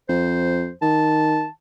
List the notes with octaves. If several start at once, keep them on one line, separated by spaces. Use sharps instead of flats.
F2 C5
D#3 A5